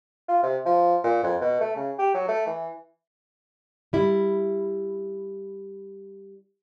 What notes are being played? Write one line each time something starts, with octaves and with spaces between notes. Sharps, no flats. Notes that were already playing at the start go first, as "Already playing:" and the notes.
F4
C3
F3
A#2
F2
B2
A3
C#3
G4
F#3
A3
E3
G3 E4